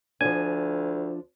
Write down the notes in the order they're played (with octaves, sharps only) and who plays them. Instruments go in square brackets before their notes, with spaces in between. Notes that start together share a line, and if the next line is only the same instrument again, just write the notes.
[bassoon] D2 [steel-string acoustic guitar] F3 D4 [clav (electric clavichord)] G#5